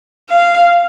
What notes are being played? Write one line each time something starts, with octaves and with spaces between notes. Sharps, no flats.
F5